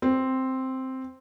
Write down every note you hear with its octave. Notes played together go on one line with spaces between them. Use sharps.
C4